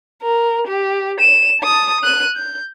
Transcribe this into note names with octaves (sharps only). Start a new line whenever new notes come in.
A#4
G4
D#7 E7
A5 D#6
F#6 D#7
G6